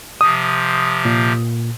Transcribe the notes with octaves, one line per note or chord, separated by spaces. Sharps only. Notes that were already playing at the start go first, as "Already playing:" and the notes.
C3 F3 D#6
A#2